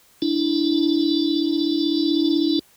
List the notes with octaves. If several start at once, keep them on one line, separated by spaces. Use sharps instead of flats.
D4 E4